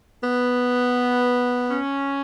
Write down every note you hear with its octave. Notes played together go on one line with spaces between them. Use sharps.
B3
C#4